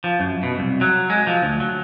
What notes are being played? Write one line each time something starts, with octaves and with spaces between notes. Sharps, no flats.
F3
F#2
B2
C2
F#3
G#3
F3
D2
F#3